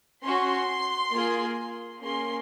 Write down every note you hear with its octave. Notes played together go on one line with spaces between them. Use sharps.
C#4 F#4 C6
A#3 F4 G#4
A#3 C#4 G#4 C6